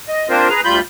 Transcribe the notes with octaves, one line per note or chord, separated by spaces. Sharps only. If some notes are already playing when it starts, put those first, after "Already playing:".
D#5
A#3 C4 D4 F4 A#4 C5
G#4 B4 A#5
D2 G3 F4 B5 G6